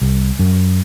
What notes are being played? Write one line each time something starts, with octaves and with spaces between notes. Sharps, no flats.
C2
F#2